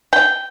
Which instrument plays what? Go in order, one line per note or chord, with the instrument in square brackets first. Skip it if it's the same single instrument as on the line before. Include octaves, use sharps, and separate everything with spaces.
[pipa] G5